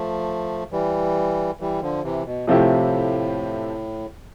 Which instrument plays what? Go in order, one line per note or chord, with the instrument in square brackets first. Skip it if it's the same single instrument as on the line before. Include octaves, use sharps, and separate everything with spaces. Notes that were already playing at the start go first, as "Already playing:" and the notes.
Already playing: [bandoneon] F3 A3
E3 G3
E3 G3
D3 F3
C3 E3
B2
[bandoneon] A2 [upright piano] C3 F3 A3 E4 G4